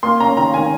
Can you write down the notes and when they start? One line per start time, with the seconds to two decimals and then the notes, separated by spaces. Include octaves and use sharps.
0.03 A#3 C6
0.20 C#4 A#5
0.37 D#3 A#5
0.54 D#3 G#5